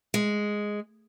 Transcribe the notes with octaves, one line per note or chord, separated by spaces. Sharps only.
G#3